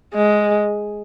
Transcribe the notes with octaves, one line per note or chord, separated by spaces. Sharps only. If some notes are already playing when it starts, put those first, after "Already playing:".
G#3